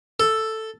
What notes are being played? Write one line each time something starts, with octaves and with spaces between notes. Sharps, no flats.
A4